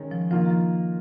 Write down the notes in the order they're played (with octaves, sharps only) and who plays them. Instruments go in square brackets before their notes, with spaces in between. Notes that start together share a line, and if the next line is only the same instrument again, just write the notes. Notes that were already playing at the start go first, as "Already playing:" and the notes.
Already playing: [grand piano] D#3 G#3 C#4
[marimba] F3
[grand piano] D#3 A#3 F4 [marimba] F3
[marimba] F3